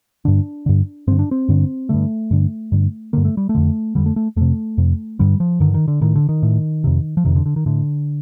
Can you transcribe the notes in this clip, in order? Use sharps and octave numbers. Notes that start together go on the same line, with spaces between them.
G2 D3 D4
G2 D3
G2 D3 C4
D4
C4
G2 D3
G2 D3 A3
G2 D3
G2 D3
G2 D3 A#3
A3
G3
A3
F2 D3
F2 D3 G3
A3
A3
F2 C3 A3
F2 C3
G2 D3 G3
F3
G2 D3 D#3
D#3
D3
A2 D#3
D3
D#3
A2
F2 C3
F3
F2 C3 D#3
D3
D3
D#3
A2 D3